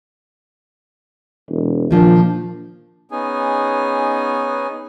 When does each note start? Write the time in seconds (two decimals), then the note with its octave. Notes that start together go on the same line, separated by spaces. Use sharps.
1.49 E1
1.91 A#2 D#3 F3 D4
3.11 B3 C#4 D#4 G#4 G#5